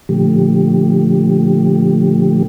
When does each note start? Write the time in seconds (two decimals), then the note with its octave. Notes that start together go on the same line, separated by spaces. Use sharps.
0.09 A#2 D3 F3 A3 G4